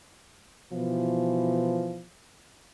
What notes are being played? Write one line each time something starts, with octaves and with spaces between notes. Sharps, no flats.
B2 E3 F3